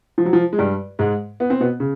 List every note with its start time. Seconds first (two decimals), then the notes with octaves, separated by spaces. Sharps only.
0.18 F3
0.25 F#3
0.33 F3
0.53 G#3
0.58 G2 G3
0.99 G#2 G#3
1.40 B3
1.50 C4
1.60 B2 B3
1.80 C#3